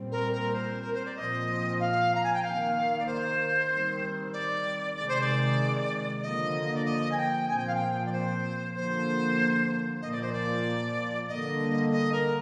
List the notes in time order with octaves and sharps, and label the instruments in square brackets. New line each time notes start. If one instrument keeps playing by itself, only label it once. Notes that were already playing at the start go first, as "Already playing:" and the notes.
Already playing: [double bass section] A#2 G3 C4
[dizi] A#4
A#4
C5
A#4
C5
D5
[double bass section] A#2 F3 C4 [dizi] D#5
[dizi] F5
A#5
G#5
G5
[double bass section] D#3 A#3 [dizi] F5
[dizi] D5
C5
[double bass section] D#3 G3 C4
[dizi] D5
[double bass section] C3 D#3 G#3 [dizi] D5
[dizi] C5
D5
[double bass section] D3 F3 A#3 [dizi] D#5
[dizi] D5
D#5
G#5
G5
[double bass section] A#2 F3 C4 [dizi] G#5
[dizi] G5
F5
G5
D5
C5
[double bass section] D3 F3 A#3 [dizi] C5
[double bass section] A#2 F3 A#3 [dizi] D#5
[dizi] D5
C5
D5
[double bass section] D3 G3 A#3 [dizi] D#5
[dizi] D#5
A#4